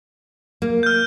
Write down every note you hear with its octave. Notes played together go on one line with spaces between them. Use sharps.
A#3
F6 G6